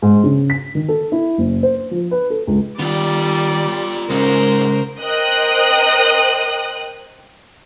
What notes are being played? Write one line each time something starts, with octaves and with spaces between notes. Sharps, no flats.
G#2
C#3
B6
D#3
A4
E4
F#1
C5
F3
B4
A4
C#2
D#3 G3 B3 F4 D5
C2 G#2 C#3 G#3 C#4 A#4 C5
A#4 C5 D#5 G5 D#6 F#6